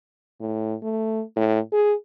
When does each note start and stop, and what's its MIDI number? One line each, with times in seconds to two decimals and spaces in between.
0.40 0.74 45
0.82 1.22 57
1.36 1.59 45
1.72 1.94 68